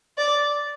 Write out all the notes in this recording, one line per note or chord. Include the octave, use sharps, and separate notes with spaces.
D5